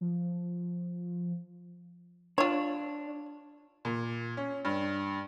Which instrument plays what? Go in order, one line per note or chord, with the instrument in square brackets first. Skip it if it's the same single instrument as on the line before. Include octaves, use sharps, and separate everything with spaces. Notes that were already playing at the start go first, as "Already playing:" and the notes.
[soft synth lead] F3
[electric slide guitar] D4 [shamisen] F4 C#5
[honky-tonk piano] A#2
C#4
G2